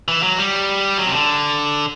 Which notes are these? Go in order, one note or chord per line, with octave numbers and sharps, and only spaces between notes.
E3
F#3
G3
F#3
C3
D3